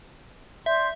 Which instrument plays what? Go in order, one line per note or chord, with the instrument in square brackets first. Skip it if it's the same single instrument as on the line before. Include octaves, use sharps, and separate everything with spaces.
[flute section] D5 C6 G6 [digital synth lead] E5